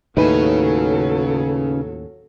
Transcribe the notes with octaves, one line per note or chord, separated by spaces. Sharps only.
D#2 A2 C#3 F#3 D#4 A4 B4 G#5